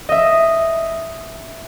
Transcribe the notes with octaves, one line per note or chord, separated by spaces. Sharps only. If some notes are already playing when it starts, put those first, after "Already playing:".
D#5 E5